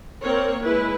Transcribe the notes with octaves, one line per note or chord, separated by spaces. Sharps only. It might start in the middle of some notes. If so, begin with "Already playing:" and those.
A#3 C4 A#4 C#5
G#3 E4 B4